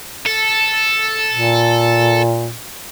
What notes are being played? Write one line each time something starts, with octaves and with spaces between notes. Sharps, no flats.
A4
A#2